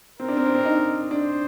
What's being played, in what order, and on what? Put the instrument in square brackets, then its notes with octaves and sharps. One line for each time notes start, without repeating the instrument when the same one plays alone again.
[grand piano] C4 [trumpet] A#4
[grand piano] D4
C4
D4
C4
D#4
[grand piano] D4 [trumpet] C5